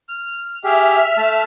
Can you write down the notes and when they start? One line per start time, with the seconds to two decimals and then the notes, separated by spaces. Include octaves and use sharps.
0.09 F6
0.64 G4 G#4 E5 F6
1.18 A3 A5